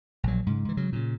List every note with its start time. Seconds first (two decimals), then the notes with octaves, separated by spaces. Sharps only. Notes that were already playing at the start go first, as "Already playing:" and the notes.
0.23 A#1 F#3
0.46 G#2 C#3
0.65 G#2 E3
0.77 C#3 F#3
0.93 A#2 C#3